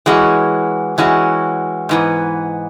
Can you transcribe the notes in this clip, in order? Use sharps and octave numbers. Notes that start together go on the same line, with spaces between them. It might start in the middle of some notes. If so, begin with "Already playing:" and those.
E3 G#3 C#4 F#4
E3 G#3 C#4 F#4
G#2 E3 B3